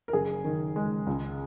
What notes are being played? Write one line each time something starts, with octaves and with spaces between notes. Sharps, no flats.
A#4
F#1 G#4
D#3
G#3
C#2